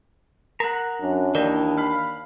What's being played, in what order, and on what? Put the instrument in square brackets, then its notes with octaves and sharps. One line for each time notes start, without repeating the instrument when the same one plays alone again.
[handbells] A#4 [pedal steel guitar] F#5 A#5
[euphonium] F#2 [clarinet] D4
[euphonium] D#2 [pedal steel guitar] E3 D#5 [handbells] A#4 D5
[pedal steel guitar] F5 B5